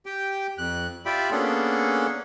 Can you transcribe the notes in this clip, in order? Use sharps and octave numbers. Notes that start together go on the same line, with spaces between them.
G4 G5
F2 F#6
F4 G4 D5 E5 G5 B5
A#3 B3 C#4 D4 G#4 A4